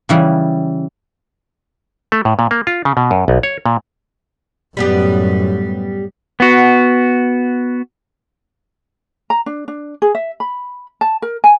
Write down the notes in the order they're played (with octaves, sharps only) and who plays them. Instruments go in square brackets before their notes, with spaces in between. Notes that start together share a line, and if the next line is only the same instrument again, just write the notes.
[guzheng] C#3 E3 G3
[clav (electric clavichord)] A3
A2
A#2
A#3
F4
C#3
B2
F#2
B1
C#5
A#2
[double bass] F#2 A2 [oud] G3 B3 G4
[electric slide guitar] B3 F#4
[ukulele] A#5
D4
D4
G#4
E5
B5
A5
A#4
G#5